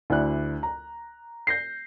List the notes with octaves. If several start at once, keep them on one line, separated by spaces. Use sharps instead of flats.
D2 E4 F#4 D5 F#6
A#5
G6 A#6 C7